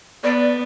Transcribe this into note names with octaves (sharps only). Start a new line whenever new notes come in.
B3 D5